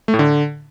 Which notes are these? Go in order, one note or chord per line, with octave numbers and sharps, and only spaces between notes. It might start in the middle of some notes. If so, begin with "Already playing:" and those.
A3
A2
D3